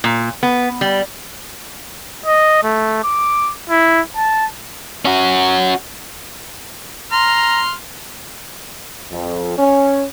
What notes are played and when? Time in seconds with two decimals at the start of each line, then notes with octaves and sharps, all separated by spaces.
0.04 A#2
0.43 B3
0.81 G3
2.26 D#5
2.63 A3
3.04 D6
3.70 E4
4.16 A5
5.05 C#4 F#4
7.12 A#5 C6 F6
9.11 F2
9.58 C#4